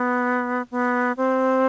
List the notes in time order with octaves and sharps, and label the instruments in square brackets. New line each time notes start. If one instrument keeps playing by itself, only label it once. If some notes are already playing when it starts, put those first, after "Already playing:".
Already playing: [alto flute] B3
B3
C4